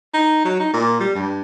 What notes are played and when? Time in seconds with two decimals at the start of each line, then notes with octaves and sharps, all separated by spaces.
0.14 D#4
0.44 F#3
0.59 D#4
0.73 A#2
1.00 G3
1.15 G2